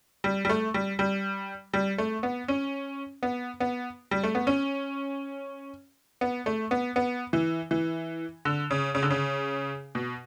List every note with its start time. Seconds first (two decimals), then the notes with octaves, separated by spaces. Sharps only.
0.24 G3
0.45 G3
0.49 A3
0.74 G3
0.99 G3
1.74 G3
1.98 A3
2.23 B3
2.48 C#4
3.23 B3
3.60 B3
4.11 G3
4.23 A3
4.35 B3
4.47 C#4
6.21 B3
6.46 A3
6.71 B3
6.96 B3
7.33 E3
7.71 E3
8.45 D3
8.71 C#3
8.95 C#3
9.03 D3
9.10 C#3
9.95 B2